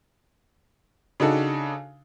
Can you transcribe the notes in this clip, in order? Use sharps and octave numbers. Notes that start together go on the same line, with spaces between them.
C#3 D4 D#4 F#4 A4